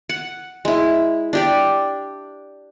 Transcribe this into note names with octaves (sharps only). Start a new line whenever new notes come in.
F#5
G#3 E4
D4 G4 D5